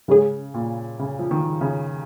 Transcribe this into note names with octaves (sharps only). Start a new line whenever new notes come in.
G#2 C#3 G#3 C#4 G#4
A#2
C#3
F3
D#3
C#3